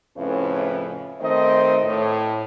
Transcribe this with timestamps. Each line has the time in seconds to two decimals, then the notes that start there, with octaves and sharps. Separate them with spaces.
0.17 F2 A2 C#3 C#4 E4 B4
1.21 D#3 A3 C4 C5 D#5
1.82 A2